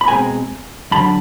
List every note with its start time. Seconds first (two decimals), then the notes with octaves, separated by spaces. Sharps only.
0.01 B5
0.08 B2 G#3 C4 G#5 A#5
0.91 F2 D3 F#3 A5 B5